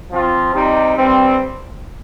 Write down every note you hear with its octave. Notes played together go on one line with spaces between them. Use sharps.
F3 C4 F4
C3 G3 C4 D#4
G2 G3 C4